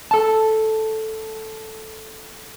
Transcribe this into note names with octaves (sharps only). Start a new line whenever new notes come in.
A4 A5